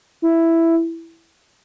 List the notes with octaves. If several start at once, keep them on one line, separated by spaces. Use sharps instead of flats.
E4